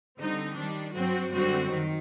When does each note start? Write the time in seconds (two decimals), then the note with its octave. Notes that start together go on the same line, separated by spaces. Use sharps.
0.19 D3 G3 C4 D#4
0.56 D#3 G3 D4
0.94 G2 F#3 C4 F#4
1.32 F#2 D3 G3 C4 F#4
1.70 D#3